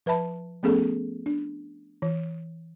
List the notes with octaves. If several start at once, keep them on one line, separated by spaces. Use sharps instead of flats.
F3 B4 E5 A5 B5
F3 A3 B3 C#4 G#4 A4
D4
E3